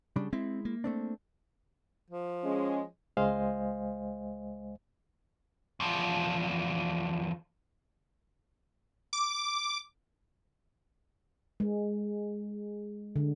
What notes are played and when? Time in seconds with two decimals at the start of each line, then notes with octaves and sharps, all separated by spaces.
0.16 C#3 G3 D4
0.33 G#3 C4 E4
0.65 A#3
0.84 A3 C4 D4
2.10 F3
2.44 G#3 C#4
3.17 C#2 G#3 C5 D#5 F5 G#5
5.80 E2 F3
9.13 D6
11.60 G#3
13.16 D3